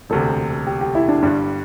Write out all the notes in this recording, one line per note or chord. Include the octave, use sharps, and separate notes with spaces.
E1 D2 C3 A4
G4
G4
E4
D4
G1 G2 G3 D4